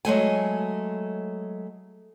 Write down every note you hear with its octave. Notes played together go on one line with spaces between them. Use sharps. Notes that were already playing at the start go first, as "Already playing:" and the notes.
F#3 G#3 A3 G#5